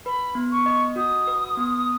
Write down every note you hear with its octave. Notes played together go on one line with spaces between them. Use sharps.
B4 B5
B3
C#6
D#5
F#4 D#6
B4
B3